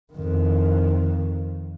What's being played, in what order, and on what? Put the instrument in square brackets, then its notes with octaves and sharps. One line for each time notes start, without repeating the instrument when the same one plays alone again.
[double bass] F2 D#3